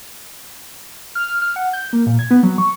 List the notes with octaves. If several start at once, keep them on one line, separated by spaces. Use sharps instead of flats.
F6
F6
F6
F#5
G6
A#3
A#2
G#6
B3
F#3
C#6